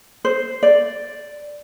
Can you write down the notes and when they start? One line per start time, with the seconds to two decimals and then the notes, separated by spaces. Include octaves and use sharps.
0.25 C5
0.63 D5